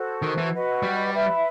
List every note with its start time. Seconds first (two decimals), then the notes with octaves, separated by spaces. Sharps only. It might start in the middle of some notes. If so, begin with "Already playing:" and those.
Already playing: F#4 A4 C5
0.22 D#3
0.38 E3
0.53 F#4 B4 D#5 F#5
0.83 G3
1.13 B4 E5 B5